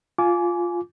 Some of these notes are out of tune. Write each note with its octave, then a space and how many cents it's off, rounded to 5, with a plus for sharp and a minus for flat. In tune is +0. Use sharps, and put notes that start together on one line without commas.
F4 +0 G#5 +15 D6 -20